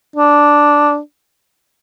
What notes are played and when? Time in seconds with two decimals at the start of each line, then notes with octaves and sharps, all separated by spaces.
0.16 D4